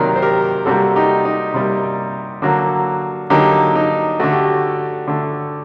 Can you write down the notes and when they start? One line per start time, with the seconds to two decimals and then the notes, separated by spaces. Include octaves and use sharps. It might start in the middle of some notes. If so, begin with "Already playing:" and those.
Already playing: C3 D#3 F#3 A#3 A#4 D5
0.16 C5
0.22 G4 A#4
0.66 C3 G3 A#3 F#4 A4
0.96 D#4 G4
1.25 D#4
1.54 C3 G3 A#3
2.42 D3 F#3 A#3 F#4
3.30 D3 F#3 A#3 D#4 G4
3.75 D#4
4.20 D3 A3 F#4
4.32 G4
4.45 F#4
5.07 D3 A3